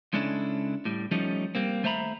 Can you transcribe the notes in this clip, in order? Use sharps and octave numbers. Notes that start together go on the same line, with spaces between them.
C#2 G#3 C#4 D4 E4 A4
A2 G3
F3 G3 A3 C#4 D#4
G3 A#3 C4
D#2 A3 C5 E5 A#5 B5